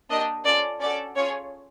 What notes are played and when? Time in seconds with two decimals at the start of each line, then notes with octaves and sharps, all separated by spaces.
0.10 A#3 D4 G4 D#5
0.45 C#4 F4 A4 D5
0.81 C#4 F#4 A4 D5
1.16 C#4 F4 G#4 C#5